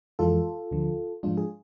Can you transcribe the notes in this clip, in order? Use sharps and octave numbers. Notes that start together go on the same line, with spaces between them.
F2 E3 G#3 F4 A4
D2 D3 F3
G#2 F3 G#3 D4 F4
G#4